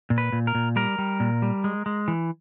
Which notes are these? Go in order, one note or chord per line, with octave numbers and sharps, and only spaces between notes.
A#2
B4
A#2
A#4
A#2
G3 A#4
G3
A#2
G3
G#3
G#3
E3